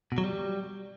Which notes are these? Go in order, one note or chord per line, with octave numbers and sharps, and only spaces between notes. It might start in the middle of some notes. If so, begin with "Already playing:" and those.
B2
F#3
G3